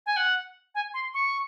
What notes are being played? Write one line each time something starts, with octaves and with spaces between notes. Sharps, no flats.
G#5
F#5
G#5
C6
C#6